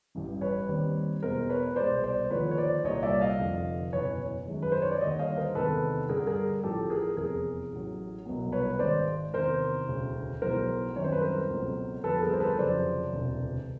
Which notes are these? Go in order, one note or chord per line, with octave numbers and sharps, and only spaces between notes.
A1 G2 E3
B4 C#5
D#2 D#3 G3 C4
E2 B2 G#3 B3 A#4 C5
B4 C#5
C2 B2 G#3 C5 D5
C5 D5
D#2 D3 F3 A3 B4 C#5
C#5
C5 D5
C2 A#2 G3 C#5 D#5
D5 E5
D#5 F5
F1 F2 D3
F#1 E2 B2 B4 C#5
F#2 D#3 G#3
B4
C5
C#5
D5
D#2 D3 G3 C#5 D#5
D#5 F5
A#4 C5
E2 C3 D#3 G#3 B3 A4 B4
G2 D3 G3 G#4 A#4
G#4 A#4
A1 A2 F3 G4 A4
G#4 A#4
F1 E2 C3 G#4 A#4
A1 A2 F#3
C2 B2 F#3 B3
B4 C#5
G#1 G#2 D#3 G#3 C5 D5
E2 C3 D#3 A#4 C5
E1 D2 C#3
B1 A2 E3 G#3 B3 A#4 C5
F#2 D#3 G3 C4 C#5
C5
B4
A#4 C5
C#2 B2 F#3 A3 C4
F2 D3 G3 B3 A4 B4
G#4 A#4
C5
A4 B4
F1 F2 C#3 F#3 C5 D5
E1 D2 C3